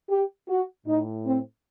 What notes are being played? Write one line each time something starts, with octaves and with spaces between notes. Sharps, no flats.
G4
F#4
A2 D#4
C4